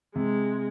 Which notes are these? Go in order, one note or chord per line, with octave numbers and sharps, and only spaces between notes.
C3 G#3